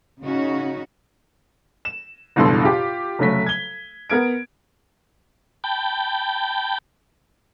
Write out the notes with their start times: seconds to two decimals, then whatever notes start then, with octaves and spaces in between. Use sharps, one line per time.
0.22 C#3 C#4 D#4 F#4
1.85 E7
2.36 F#1 E2 G2 B2 A4 C6
2.63 F4 G4
3.19 F1 C#3 F#3 A3 B6
3.46 G#6 G7
4.10 B3 A#4 G#6 D7
5.64 G5 A5 B5 G6